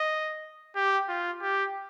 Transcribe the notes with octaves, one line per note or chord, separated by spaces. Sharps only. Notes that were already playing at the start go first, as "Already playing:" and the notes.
Already playing: D#5
G4
F4
G4